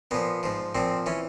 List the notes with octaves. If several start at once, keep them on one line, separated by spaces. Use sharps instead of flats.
A#2 F3 B3
G#2 F3
A#2 F3 C4
E3 C#4